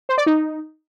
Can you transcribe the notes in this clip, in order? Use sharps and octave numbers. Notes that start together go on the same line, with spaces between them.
C5
D5
D#4